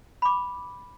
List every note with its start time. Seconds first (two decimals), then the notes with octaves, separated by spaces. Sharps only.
0.22 B5 D6